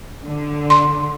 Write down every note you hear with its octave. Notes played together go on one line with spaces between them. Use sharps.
D3
C6